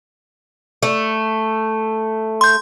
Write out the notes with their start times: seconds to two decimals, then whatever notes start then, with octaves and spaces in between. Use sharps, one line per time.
0.83 A3
2.41 C6 G6